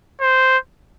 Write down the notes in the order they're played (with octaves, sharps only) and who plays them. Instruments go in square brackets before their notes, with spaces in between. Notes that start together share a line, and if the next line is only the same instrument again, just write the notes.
[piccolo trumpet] C5